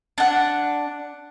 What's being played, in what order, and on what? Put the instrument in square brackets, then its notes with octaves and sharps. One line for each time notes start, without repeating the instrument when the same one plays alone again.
[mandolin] D4 F#5